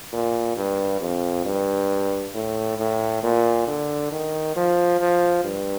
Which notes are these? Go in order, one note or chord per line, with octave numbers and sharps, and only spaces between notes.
A#2
G2
F2
G2
A2
A2
A#2
D3
D#3
F3
F3
G2